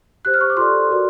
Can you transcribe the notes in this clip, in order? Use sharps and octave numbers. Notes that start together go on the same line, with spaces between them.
G4 C5 F#6
F6
C#6
D6
F4 A4 D5 C6
F#4 A#4 D5